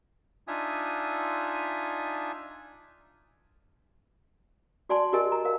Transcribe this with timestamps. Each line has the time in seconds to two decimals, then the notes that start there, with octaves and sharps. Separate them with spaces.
0.48 D4 D#4 F4 E5 G#5 D#6
4.89 F#4 D5 G#5 A5 C6
5.13 F#4 G4 A#4 D#5 G#5
5.32 A#5
5.45 A#4 F5